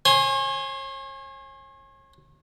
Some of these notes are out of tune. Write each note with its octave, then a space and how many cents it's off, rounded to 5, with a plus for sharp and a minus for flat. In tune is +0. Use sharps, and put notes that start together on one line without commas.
C#5 -40 G#5 -5 C6 +0